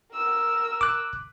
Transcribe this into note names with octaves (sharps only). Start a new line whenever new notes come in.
A#4 E6
D6 F#6